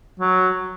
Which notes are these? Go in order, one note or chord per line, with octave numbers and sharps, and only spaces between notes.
F#3